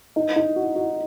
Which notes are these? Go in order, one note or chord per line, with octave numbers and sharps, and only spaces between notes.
D#4
D#4
F#4
F#4